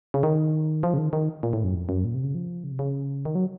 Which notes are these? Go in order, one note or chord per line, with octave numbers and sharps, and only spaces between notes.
C#3
D#3
F3
C#3
D#3
D#3
A#2
A2
F#2
F2
F#2
A#2
C3
C#3
F3
C#3
C3
C#3
D#3
F#3